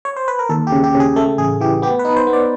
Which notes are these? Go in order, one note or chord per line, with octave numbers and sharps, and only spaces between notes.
C#5
C5
B4
A#4
D#2 A4
G4
C#3
G4
C#3
G#4
A3 A4
A1 G#4
E3 G4
B3 G4
B4
D#4
C5
B3
D5